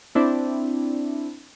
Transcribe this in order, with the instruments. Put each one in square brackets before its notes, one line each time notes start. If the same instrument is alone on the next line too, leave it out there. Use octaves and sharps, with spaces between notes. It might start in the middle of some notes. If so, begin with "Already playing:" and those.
[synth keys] C4 D4 E4